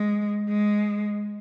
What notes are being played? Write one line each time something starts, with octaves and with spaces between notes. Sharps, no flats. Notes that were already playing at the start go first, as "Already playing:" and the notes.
Already playing: G#3
G#3